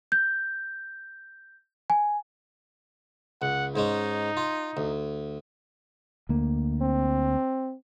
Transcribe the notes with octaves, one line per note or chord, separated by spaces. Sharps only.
G6
G#5
C#2 F#5
G#2 G#3 C#4 D#4
F4
D2
D2 A#3
C4